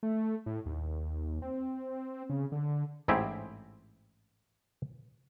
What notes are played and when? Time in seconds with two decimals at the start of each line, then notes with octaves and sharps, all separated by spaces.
0.03 A3
0.46 A2
0.66 D#2
1.42 C4
2.30 C#3
2.52 D3
3.08 A1 G#2 C4 E4 G4 G#4